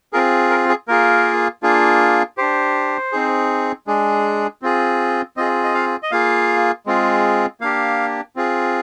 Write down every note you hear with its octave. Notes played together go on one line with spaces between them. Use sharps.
C4 F4 G#4 A#4
A#4
G#4
A#3 F4 G#4 A#4
A#3 D4 F4 G#4
D4 G4 C5
C4 D#4 G#4
G#3 D4 G#4
C4 F4 G#4
C4 F4 G#4 D#5
D#5
F5
D#5
A#3 F4 G#4 F5
G#3 C4 F4 G#4
A#3 D4 G4 F5
C4 F4 G#4